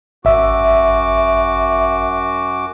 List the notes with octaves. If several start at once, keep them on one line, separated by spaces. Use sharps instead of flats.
G#1 F#2 F#4 E5 D6